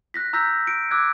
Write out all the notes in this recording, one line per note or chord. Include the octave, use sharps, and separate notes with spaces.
F#6 A#6 B6
A#5 E6 G6 A#6 B6
C#7 D7
D6 E6 F#6 G#6